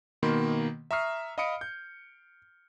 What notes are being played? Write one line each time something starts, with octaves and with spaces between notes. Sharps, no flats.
B2 D#3 A#3 B5 C6
E5 A#5 C#6 D#6 F6 C7
D#5 F5 B5 D#6 C#7 D7
G6